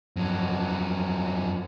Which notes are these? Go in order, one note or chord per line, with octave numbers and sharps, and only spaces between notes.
F2 F#3